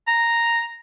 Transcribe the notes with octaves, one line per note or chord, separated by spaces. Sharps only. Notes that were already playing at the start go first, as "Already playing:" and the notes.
A#5